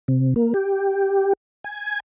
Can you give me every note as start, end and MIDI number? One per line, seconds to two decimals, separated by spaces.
0.08 0.34 48
0.36 0.53 58
0.54 1.33 67
1.64 2.00 80